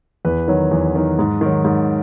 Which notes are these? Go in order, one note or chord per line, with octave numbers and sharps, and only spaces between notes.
E2 B4
D#3 F#3
E2
D#3 F#3
G#2
D#3 F#3
G#2